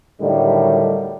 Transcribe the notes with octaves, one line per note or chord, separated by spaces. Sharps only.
A2 D3 D#3 F#3 G3